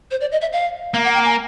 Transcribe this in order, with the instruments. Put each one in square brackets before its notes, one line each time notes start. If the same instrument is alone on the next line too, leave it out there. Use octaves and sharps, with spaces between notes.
[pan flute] C5
D5
D#5
E5
F5
[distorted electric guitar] A#3 [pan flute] F5
[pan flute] F#5
G5
G#5